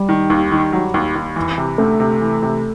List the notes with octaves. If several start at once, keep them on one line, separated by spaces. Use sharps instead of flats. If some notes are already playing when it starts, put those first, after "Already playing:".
Already playing: G3
D#3
D#2
D#3
F#3
D#2
D#2
E3
C3
D2 A3
C3
E3
C3